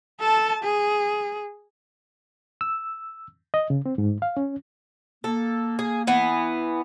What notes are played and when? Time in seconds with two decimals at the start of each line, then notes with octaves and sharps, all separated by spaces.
0.20 A4 A5
0.63 G#4
2.61 E6
3.54 D#5
3.70 C#3
3.86 C4
3.98 G#2
4.22 F5
4.37 C#4
5.24 A#3 A4
5.79 G#4
6.07 E3 B3